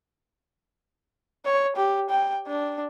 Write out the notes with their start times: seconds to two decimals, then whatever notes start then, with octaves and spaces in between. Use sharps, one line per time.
1.45 C#5
1.76 G4
2.10 G5
2.47 D4